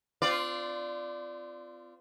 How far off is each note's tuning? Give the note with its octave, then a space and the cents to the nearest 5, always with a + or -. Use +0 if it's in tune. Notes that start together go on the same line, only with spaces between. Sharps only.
C4 -35 F4 -10 D5 +0